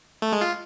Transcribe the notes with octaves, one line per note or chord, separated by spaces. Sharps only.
A3
G#3
F4